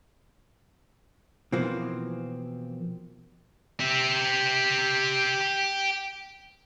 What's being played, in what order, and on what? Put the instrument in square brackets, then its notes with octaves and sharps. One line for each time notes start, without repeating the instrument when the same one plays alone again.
[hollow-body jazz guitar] B2 E3 F3 A#3 C4
[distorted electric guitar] G4 E5